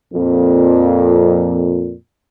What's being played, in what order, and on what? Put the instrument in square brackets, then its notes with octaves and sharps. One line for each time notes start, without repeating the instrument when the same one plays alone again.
[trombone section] F2 A#2